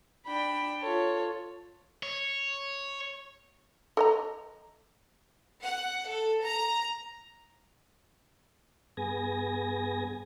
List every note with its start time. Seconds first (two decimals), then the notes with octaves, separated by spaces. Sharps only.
0.25 D4 G5 B5
0.81 F4 A4 C#5
2.03 C#5
3.97 A4 D#5 A#5
5.63 F#5
6.08 A4
6.44 A#5
8.97 G2 B3 G#4 G#5 A#6